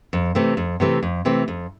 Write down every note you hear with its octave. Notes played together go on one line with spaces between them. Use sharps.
F2
C3 E3 A3 C4
F2
C3 E3 A3 C4
F2
C3 E3 A3 C4
F2